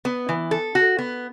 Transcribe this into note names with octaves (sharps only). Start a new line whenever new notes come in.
B3
E3
A4
F#4
B3